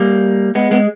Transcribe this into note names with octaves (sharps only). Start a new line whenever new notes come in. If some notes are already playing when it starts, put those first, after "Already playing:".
Already playing: G3 A#3
G#3 B3
G#3 B3